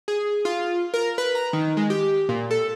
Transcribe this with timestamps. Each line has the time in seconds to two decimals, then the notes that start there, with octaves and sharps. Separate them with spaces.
0.08 G#4
0.45 F4
0.94 A#4
1.18 B4
1.35 A#5
1.53 D#3
1.77 G#3
1.90 G4
2.29 A#2
2.51 A4